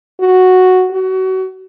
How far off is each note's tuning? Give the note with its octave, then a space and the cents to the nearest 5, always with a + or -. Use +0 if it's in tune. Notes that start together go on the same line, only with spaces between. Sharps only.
F#4 +0
F#4 +30